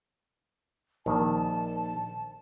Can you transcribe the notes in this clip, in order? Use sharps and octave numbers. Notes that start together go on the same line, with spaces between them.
A#1 D#3 A5